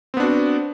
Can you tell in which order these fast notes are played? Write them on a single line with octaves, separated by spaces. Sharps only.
C4 B3 D4 F#4